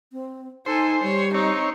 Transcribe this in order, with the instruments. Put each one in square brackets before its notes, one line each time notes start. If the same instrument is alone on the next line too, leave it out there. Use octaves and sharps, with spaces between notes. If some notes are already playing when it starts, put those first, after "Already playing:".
[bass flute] C4
[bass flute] D#4 [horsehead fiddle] A4 G#5 [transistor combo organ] C5
[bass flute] G3 [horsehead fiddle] C#5
[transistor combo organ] C4 C#5 [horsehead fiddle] D#4